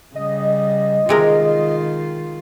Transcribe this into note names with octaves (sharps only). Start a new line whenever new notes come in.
C#3 G3 D#5
C3 D#3 G#3 F4 A#4